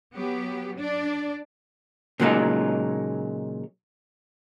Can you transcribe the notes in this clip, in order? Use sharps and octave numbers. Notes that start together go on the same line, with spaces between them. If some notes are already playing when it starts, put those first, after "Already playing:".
F#3 B3 G4
D4 D5
A#2 C#3 F#3 G#3 D#4 F4